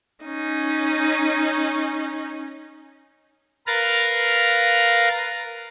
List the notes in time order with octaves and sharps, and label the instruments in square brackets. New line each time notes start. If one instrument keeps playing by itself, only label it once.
[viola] C#4 D#4
[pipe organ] A#4 B4 F5 F6 A6 A#6